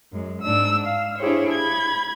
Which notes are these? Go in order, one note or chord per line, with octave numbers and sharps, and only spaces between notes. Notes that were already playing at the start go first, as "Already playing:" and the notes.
F#2 G#3
G#2 D4 E6
F5
D4 E4 G4 G#4 C5 C#5
B5 G#6